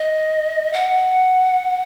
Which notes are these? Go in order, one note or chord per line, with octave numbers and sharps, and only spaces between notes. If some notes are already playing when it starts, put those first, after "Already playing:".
Already playing: D#5
F#5